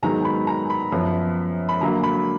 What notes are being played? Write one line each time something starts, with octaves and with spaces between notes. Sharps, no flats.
G#2 D#3 F#3 B3 A#5
B5
A#5
B5
F#2 F3 B3
B5
D3 F#3 A#3 A#5
B5